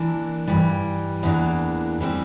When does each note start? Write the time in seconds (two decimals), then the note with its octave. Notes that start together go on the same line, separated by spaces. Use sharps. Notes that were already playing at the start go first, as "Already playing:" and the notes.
Already playing: E3 A#3 D4
0.48 G2 E3 G3
1.23 E2 E3 A#3 D4
2.01 E3 G3 C4